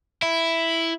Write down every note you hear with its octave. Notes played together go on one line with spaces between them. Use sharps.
E4